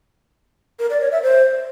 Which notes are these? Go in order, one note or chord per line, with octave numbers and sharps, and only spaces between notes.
A#4
D5
C#5
E5
C5